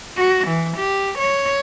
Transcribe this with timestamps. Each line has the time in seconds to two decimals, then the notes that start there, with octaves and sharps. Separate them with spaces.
0.17 F#4
0.47 E3
0.78 G4
1.19 C#5